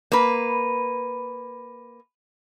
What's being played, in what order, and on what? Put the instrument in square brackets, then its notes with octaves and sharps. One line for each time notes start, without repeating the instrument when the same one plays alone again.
[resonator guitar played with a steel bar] A#3 B4